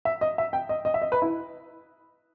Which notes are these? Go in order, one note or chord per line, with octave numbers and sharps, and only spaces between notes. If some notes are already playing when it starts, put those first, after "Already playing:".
E5
D#5
E5
G5
D#5
D#5
E5
D#5
B4
E4